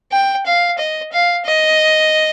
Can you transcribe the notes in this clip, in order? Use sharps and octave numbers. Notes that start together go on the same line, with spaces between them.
G5
F5
D#5
F5
D#5